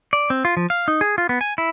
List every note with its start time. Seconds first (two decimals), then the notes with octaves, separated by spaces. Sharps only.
0.13 D5
0.30 C4
0.45 F4
0.57 F3
0.70 F5
0.88 D#4
1.01 G#4
1.18 F4
1.29 B3
1.41 G#5
1.58 E4